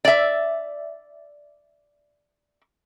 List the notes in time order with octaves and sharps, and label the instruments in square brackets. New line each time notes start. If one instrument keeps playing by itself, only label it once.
[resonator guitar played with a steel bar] D5 E5